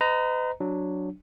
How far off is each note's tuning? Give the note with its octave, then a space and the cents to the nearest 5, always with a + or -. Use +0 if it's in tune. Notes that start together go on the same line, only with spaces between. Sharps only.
B4 +45 D#5 +0 A#5 +0
F#3 -5 D4 +0